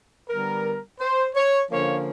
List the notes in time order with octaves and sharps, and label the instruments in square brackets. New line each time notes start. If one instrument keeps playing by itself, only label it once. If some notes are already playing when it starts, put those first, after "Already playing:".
[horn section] D3 G3 B3 A#4
C5
C#5
D3 F3 A#3 C#4 C#5